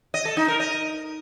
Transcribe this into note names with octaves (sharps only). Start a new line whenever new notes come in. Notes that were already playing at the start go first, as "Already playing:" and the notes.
D#5
A4
D#4
A#4
D#5